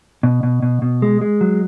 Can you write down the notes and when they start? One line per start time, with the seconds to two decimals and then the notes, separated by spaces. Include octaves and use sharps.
0.23 B2
0.43 B2
0.62 B2
0.82 B2
1.02 G#3
1.21 G#3
1.41 F#3